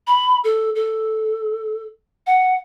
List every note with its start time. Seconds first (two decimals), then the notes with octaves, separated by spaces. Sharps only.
0.07 B5
0.44 A4
0.75 A4
2.27 F#5